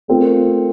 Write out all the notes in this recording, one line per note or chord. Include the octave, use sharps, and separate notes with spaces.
A3 C4 F4 A#4